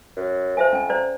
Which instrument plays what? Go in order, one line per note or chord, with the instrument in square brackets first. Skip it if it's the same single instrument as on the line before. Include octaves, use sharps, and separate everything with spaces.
[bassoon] F#2
[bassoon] F2 [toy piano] C5 E5 G#5
[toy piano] C#4 G#5
C5 D5 A#5